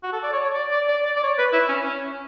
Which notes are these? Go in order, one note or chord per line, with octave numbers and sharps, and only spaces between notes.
F#4
A4
D5
C#5
C#5
D5
D5
D5
D5
D5
C#5
B4
E4
C#4
C#4